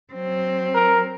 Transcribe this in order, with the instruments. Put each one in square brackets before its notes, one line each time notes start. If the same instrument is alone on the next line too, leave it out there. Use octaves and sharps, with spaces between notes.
[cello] F#3 C4
[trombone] A#4